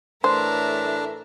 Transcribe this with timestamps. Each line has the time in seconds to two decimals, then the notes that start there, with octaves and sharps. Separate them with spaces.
0.24 A2 E3 A3 D4 A#4 C5 E5